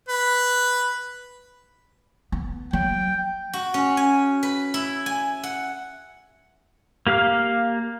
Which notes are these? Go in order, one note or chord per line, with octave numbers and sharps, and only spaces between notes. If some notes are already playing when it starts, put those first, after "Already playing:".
B4
B3
F#3 G5
F#4
C#4
G#5
B4
E4
G#5
F#5
A#3 G4 F5 F6